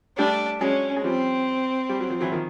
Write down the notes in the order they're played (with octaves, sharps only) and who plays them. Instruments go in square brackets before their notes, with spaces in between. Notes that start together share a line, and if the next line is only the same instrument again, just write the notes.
[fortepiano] G3 A3 [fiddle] D4
[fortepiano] F#3 G#3 [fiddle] C#4
[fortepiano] G#3
[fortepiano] F3 G3 [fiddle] C4
[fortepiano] G3
F#3
F3
E3 F#3
D#3 F3